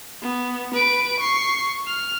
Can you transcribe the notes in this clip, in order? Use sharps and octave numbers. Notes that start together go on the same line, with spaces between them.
B3
B4 D7
C#6 C7
F6